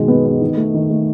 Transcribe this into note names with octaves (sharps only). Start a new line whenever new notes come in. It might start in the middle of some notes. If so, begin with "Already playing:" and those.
Already playing: B2 D#3 G#3
B3
B3
D#3
A3
D#3
A3